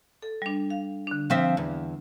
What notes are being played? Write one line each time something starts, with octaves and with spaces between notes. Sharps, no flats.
A4
G3 D4
F5
D3 D4
F3 C4 E5
E2